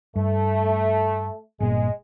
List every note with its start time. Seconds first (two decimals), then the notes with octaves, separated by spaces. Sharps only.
0.16 G2 A3
1.60 G1 A#2 G#3